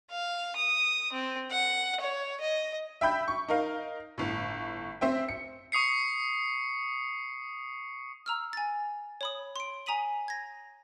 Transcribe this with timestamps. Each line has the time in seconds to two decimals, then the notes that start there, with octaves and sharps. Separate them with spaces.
0.11 F5
0.56 D#6
1.12 C4
1.51 F#5
2.00 C#5
2.40 D#5
3.01 E5 G5 B5 G6
3.28 C#6
3.49 D#4 A#4 F5
4.18 G1 A2
5.01 C4 C5 E5 G5
5.29 C#7
5.72 C#6 D#6 C7 C#7
8.26 A#5 E6 F6
8.53 G#5 A6
9.21 C#5 B5 D#6
9.56 C6 D7
9.86 G#5 A#5 D#6 B6 D#7 F#7
10.28 G#6 A#6